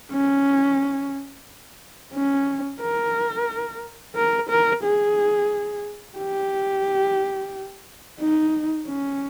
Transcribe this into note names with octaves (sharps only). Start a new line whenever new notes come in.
C#4
C#4
A#4
A#4
A#4
G#4
G4
D#4
C#4